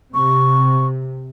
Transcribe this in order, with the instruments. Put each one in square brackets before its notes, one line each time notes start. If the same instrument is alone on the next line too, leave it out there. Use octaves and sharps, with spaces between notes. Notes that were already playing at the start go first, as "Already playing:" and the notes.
[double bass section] C3 [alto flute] C#6